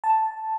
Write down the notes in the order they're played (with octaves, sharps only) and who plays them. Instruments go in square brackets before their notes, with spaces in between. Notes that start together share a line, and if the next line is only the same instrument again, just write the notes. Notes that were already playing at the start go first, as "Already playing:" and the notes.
[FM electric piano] A5